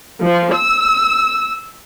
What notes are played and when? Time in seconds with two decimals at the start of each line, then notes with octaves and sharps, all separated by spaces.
0.22 F3
0.54 E6